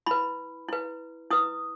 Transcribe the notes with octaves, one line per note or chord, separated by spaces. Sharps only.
E4 B4 B5
E4 B4
E4 B4 D#6